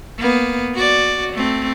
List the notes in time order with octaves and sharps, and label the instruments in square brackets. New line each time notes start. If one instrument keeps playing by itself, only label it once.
[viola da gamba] A#3 B3
F#4 D5
A3 C4